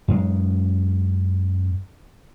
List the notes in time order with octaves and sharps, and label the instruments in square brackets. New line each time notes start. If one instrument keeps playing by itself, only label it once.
[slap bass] F#2 G#3